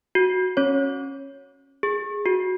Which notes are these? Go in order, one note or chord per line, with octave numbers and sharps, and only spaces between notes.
F#4
C#4 C#5
G#4
F#4